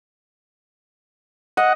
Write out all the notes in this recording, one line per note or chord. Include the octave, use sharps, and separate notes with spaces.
D#5 F#5